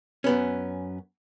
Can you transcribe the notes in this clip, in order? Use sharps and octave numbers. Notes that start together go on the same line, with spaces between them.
F#2 B3 C#4